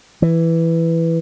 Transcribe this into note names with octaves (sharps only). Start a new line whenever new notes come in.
E3